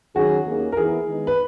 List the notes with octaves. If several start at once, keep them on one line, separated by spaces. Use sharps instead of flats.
D#3 F#3 C#4 F#4 G#4
D#2 D#3 A#3 C#4 G#4
A#4
E3 B3 E4 G#4
D#3 G#3 B3 D#4
B4